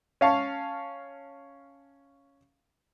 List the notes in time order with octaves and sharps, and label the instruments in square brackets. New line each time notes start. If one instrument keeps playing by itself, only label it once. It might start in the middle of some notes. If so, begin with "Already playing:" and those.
[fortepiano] C#4 F5 A5 C#6